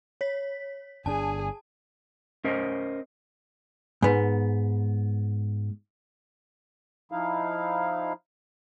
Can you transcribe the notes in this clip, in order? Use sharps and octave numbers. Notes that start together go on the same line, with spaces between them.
C#5 B6
G1 D4 G#4 G#5 A5
C#4 A#4 C5 D#5
G#2 B3
F3 D#4 E4 F5